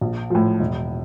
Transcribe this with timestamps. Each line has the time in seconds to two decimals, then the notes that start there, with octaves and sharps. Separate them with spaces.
0.01 A#1
0.30 A2 F3
0.60 E1